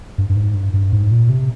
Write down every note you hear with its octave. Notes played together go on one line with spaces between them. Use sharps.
G2
G2
G#2
G2
G2
G#2
A#2
C3